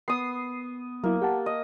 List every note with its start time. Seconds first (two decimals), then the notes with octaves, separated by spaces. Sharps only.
0.08 B3 D#6 C7
1.04 F#3 A#3 E4
1.22 G4 F#5 A5
1.46 D#5